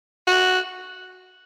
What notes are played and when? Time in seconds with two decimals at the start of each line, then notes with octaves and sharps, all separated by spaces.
0.27 F#4